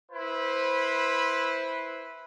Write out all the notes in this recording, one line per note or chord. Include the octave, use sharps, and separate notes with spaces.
E4 B4 C5